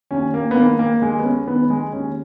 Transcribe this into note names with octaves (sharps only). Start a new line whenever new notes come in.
D#2 C#4
A#3
B3
D#3 G#3 A#3
A#3
D#2 G#3
B3
C#4
D#3 G#3 B3
G#3
D#2 C#4